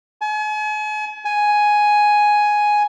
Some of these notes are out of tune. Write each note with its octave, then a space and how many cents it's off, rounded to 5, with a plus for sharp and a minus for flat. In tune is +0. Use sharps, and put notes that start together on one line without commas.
G#5 +40
G#5 +5